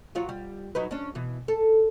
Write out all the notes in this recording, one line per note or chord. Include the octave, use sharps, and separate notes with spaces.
F#3 F4 C#5
G3
F#3 D#4 B4
C#4 D4
B2 E3
A4